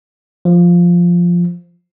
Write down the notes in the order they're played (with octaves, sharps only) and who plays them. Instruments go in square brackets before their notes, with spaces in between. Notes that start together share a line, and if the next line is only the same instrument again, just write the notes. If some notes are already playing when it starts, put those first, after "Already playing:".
[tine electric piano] F3